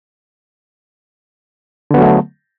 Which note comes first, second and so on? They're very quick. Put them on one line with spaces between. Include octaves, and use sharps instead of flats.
D3 B3 F#3 A3